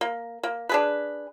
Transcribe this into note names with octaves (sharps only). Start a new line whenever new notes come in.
A#3
A#3
D4 G#4 B4